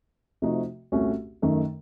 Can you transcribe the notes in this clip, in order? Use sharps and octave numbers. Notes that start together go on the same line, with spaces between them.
C3 F3 A3 D#4 F#4
C2 A#2 A3 C#4 F#4
F#2 D#3 A3 D#4